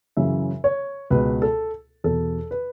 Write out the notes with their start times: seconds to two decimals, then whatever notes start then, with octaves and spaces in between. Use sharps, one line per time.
0.17 F#2 C#3 E3 E5
0.64 C#5
1.10 C#2 B2 B4
1.42 A4
2.04 E2 B2 A4
2.51 B4